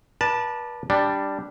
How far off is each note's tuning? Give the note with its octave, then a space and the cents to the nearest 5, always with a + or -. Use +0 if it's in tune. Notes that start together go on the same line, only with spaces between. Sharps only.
B4 -35 D5 +25 A5 +0
G3 +0 D4 +0